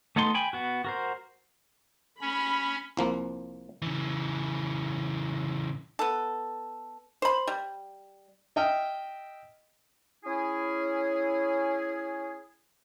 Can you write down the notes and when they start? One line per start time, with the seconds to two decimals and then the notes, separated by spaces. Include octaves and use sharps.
0.16 A3 B3 D#4 A4 C6
0.34 G5 G#5 B5
0.53 B3 F#4
0.85 F#4 A#4 C5
2.21 C#4 B5
2.97 C2 F3 A#3
3.82 C#3 E3
5.99 B3 A4
7.22 C5 B5
7.47 G3
8.56 D#5 E5 G5 D#6 F6
10.24 C#4 E4 G#4